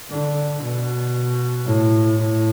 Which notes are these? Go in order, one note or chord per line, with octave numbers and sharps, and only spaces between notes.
D3
B2
A2
A2